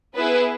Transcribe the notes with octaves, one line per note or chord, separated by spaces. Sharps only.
B3 E4 G#4 B4